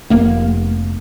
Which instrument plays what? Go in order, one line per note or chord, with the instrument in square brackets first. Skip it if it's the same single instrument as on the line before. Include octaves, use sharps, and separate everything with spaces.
[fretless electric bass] F1 A#3 B3